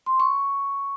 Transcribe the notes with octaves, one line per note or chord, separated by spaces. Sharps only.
C6
C#6